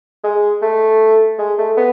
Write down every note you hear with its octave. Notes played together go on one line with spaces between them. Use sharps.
G#3
A3
G#3
A3
B3